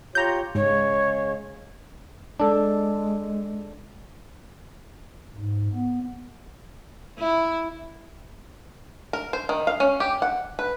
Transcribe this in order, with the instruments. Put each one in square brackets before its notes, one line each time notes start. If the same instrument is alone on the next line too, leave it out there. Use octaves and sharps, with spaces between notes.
[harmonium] F4 G4 C#5 [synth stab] A#5 G6
[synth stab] G#2 [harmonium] C#3 G#3 [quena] C#5
[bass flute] G#3 [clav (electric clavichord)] D4 A4
[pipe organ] G#2
B3
[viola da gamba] E4
[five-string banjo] A#4
C5
D#3
F5
C#4
G4
F#5
B4